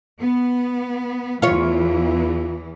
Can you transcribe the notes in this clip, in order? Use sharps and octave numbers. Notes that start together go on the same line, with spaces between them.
B3
E2 E3 F4 C#5